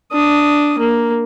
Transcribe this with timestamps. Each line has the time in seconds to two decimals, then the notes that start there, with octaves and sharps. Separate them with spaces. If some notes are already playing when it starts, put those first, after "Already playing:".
0.12 D4 D#6
0.78 A#3